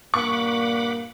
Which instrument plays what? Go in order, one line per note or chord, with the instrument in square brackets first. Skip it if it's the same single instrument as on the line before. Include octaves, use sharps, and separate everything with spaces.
[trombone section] G2 A#2 A#3 [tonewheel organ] F#5 B5 D6 [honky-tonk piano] C#6